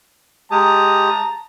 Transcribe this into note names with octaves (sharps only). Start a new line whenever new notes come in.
G#3 G4 A5 A#5 D#6